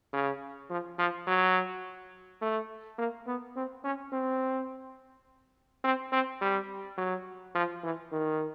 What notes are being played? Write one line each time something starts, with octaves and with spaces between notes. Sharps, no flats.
C#3
F3
F3
F#3
A3
A#3
B3
C4
C#4
C4
C4
C4
G3
F#3
F3
E3
D#3